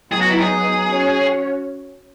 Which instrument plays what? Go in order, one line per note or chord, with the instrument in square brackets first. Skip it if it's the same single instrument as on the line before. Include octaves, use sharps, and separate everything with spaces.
[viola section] F#3 B3 D#4 [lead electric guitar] G#4
[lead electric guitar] F#4
E4
G#4
[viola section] C#4 F#4 C#5